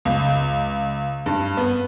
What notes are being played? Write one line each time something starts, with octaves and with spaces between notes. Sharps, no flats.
C#2
G2
B3